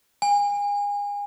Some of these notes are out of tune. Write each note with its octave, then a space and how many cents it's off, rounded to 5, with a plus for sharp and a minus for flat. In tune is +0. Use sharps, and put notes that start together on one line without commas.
G#5 -30